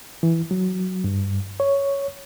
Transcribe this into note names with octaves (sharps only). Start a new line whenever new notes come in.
E3
F#3
G2
C#5